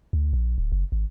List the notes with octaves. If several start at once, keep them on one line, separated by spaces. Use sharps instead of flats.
D2
A#1
D1
F#1
G#1